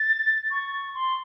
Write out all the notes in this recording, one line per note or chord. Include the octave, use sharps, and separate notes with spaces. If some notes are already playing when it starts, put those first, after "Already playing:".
Already playing: A6
C#6
C6